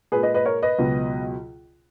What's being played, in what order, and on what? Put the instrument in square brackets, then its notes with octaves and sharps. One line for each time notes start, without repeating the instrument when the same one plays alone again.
[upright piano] A#2 G#3 G#4 B4
B4 D#5
B4 D#5
A#4 C#5
B4 D#5
C#2 B2 F#3